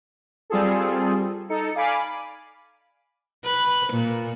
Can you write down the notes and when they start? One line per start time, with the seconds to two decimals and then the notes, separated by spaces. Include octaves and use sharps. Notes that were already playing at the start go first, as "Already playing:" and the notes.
0.50 G3 C4 F4 G#4 A4
1.49 D#4 A4 C#7
1.75 D5 F5 G#5 B5 D6
3.45 B4
3.92 A#2